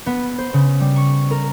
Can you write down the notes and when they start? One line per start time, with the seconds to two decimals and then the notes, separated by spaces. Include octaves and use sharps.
0.06 B3
0.38 C5
0.54 C#3
0.80 G3
0.96 C#6
1.31 A#4